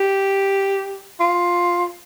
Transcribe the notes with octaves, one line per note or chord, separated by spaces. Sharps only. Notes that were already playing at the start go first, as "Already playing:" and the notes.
Already playing: G4
F4